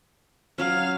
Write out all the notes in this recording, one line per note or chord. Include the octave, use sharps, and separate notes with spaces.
F#3 C#4 F5